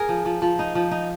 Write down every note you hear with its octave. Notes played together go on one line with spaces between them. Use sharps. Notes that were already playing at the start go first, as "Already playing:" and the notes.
Already playing: G#4 A#4
F3
F3
F3
D#4
F3
D#4